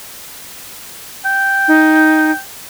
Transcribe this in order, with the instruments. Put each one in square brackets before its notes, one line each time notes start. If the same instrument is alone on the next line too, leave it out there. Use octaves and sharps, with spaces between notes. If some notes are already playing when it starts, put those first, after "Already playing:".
[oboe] G5
[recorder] D#4